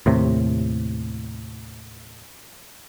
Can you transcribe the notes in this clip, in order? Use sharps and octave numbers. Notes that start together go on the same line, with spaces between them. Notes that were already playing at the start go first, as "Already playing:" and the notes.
D#2 A2 C3